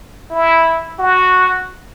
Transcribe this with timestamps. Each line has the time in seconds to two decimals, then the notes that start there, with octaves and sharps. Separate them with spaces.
0.31 E4
0.99 F#4